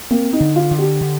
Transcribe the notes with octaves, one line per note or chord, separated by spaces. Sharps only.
A#3 C4
D#4
D3
F4
D3
G4
D3